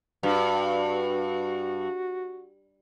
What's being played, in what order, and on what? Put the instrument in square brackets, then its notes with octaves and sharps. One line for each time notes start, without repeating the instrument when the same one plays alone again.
[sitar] G2 [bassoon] F#4